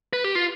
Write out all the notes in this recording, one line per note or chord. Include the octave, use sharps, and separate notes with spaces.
B4
G4
F4